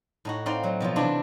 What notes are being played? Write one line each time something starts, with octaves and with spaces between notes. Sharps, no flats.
A2 D#4 F#4
C4 D#4 D5 F5 C6
F#3
B2 F3 F#3 F4
C3 E3 D4 E4 C6